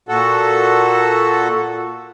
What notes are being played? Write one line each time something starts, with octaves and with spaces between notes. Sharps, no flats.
A#2 F#4 A4